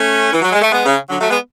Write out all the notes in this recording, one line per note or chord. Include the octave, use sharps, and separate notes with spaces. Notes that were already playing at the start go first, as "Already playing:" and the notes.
Already playing: A3 C#4
E3
F#3
G#3
A3
G#3 B3
C#3
D3 F#3
F#3 A3
G#3 B3